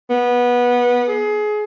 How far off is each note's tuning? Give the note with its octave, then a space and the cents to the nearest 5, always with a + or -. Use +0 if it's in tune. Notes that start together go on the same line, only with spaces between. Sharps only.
B3 -20
G#4 +25